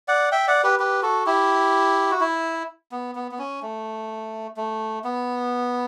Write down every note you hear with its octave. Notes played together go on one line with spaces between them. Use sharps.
D5 F#5
E5 G5
D5 F#5
G4 B4
G4 B4
F#4 A4
E4 G4
F#4
E4
B3
B3
B3
C#4
A3
A3
B3